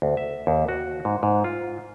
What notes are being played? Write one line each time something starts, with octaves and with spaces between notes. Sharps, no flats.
D2
E5
D#2
F#4
G#2
G#2
F4